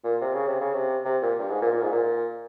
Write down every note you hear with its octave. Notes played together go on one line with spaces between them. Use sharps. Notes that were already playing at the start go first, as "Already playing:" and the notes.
A#2
C3
C#3
C3
C#3
C3
C3
A#2
G2
G#2
A#2
A#2
G#2
A#2